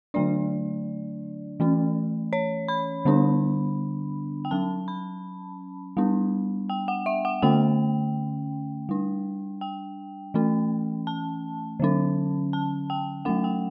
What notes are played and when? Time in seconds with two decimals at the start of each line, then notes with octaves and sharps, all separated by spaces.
0.14 D3 F#3 A3 D4 D5
1.60 E3 A3 C#4
2.33 C#5
2.68 B5
3.05 D3 G3 B3 D4
4.45 G5
4.51 F#3 C#4 A5
4.88 B5
5.97 G3 B3 D4
6.70 G5
6.88 F#5
7.06 E5
7.25 F#5
7.42 D3 A3 C#4 G5
8.89 G3 D4
9.61 G5
10.34 E3 A3 C#4
11.07 A5
11.80 D3 F#3 C#4
12.53 A5
12.90 G5
13.25 F#3 A3 C#4 F#5
13.44 G5